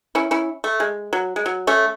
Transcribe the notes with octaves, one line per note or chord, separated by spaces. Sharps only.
C#4 E4
C#4 E4
A3
G#3
F#3
G#3
F#3
A3 C#4